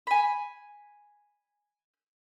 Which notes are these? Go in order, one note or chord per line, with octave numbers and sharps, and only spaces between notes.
G#5 B5